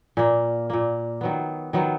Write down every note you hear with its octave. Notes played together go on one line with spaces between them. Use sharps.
A#2 A#3
A#2 A#3
D#3 F#3 B3
D#3 F#3 B3